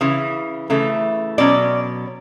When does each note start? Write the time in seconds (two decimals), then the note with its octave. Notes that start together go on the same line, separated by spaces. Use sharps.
0.01 C#3 E3
0.70 C#3 E3 A3
1.38 B2 F#3 C#4 D5